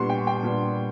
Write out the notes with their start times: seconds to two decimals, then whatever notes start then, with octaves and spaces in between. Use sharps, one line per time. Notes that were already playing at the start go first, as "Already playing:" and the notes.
Already playing: A#2 G3 B3 D4 C6 C#6
0.09 G5
0.27 G5
0.43 A#2 G3 B3 D4